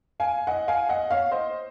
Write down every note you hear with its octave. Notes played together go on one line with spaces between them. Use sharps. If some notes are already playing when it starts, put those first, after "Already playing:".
F5 G#5
D#5 F#5
F5 G#5
D#5 F#5
C#5 F5
C5 D#5